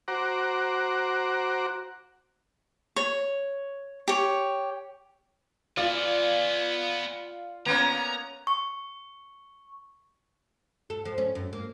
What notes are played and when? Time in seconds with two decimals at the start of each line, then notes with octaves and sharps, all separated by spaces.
0.08 F#4 C5 F#5 A#5 D6
2.96 C#5
4.08 G4 C#5
5.77 B3 F4 G#4 D5
7.66 A#3 B3 C#4 A#5
8.47 C#6
10.90 A4
11.05 F3
11.18 C#4
11.35 F#2
11.53 A#3